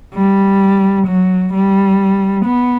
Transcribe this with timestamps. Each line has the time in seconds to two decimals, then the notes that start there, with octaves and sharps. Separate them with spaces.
0.14 G3
1.06 F#3
1.53 G3
2.45 B3